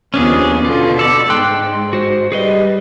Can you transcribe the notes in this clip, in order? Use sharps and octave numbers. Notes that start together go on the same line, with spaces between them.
D#2 F3 B3 C#4 D4 G#4
B2 D3 F4
A4 D5
G#2 G5 C6 F#6
F#4 C5
G3 G#4 B4 D#5